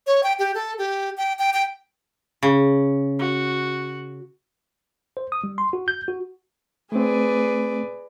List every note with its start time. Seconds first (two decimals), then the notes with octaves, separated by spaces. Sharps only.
0.07 C#5
0.23 G5
0.39 G4
0.55 A4
0.78 G4
1.17 G5
1.39 G5
1.53 G5
2.43 C#3
3.19 F#4
5.17 C5
5.32 D#6
5.44 G3
5.58 C6
5.73 F#4
5.88 G6
6.08 F#4
6.92 A3 C4 G#4 B4 D5